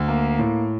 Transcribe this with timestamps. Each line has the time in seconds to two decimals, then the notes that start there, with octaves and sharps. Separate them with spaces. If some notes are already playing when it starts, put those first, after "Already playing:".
Already playing: D2
0.08 A#3
0.39 A2